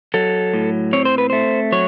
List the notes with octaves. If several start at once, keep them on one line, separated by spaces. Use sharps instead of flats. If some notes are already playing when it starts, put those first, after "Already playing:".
F#3 A4
A2
C4 C#5
C5
B4
A3 C5
F#3 C#5